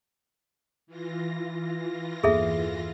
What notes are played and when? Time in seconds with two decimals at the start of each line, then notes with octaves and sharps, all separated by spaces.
0.87 E3 F4 A#6
2.23 E2 G2 A#3 G#4 A4 E5